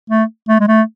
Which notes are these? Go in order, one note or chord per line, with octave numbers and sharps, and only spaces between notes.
A3
A3
G#3
A3